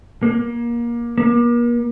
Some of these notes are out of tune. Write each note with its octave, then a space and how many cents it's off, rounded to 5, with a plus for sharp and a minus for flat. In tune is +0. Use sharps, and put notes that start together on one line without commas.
A#3 +20
A#3 +40